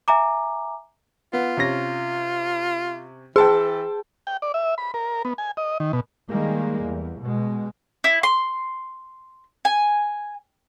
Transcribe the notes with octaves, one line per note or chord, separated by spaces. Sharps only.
E5 G#5 A#5 D6
B3 F4
C3 C#4 A#6
E3 G#4 G5 A5 C6
G5
D5
E5
B5
A#4
B3
G#5
D#5
D#3
B2
D#3 G3 G#3 A#3
E2
B2 G#3
E4
C6
G#5